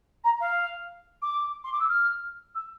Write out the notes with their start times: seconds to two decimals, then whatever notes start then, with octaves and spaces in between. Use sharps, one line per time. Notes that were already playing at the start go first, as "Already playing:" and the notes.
0.24 A#5
0.40 F5
1.22 D6
1.64 C6
1.72 D6
1.79 E6
1.88 F6
2.54 E6